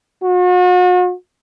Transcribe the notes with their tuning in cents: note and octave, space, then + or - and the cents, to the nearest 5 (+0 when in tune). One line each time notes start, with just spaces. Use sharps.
F#4 -40